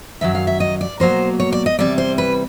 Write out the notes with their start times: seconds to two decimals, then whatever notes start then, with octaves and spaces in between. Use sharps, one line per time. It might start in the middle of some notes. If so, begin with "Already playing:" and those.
0.21 F#2 D#3 F#3 E5
0.35 F5
0.47 E5
0.60 D#5
0.81 D5
1.00 B2 F#3 A#3 C5
1.40 C#5
1.52 D5
1.66 D#5
1.79 C3 E3 G3 D5
1.98 C5
2.18 B4